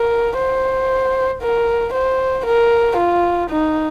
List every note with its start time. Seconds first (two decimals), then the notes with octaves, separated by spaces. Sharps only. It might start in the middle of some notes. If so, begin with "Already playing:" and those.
Already playing: A#4
0.38 C5
1.42 A#4
1.94 C5
2.46 A#4
2.97 F4
3.50 D#4